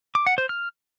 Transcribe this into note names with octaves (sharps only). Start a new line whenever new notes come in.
D6
F#5
C5
F6